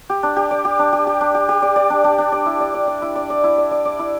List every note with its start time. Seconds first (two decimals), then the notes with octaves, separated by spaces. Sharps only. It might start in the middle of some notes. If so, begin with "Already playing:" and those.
0.10 G4
0.23 D4
0.36 G4
0.51 D5
0.65 G4
0.79 D4
0.93 G4
1.07 G4
1.21 D4
1.34 G4
1.49 G4
1.62 D5
1.76 D5
1.90 D4
2.04 D4
2.18 D4
2.32 D5
2.46 E4
2.60 D5
2.74 D5
2.87 D5
3.02 E4
3.16 D5
3.30 D5
3.44 E4
3.58 D5
3.71 D5
3.85 D5
3.99 E4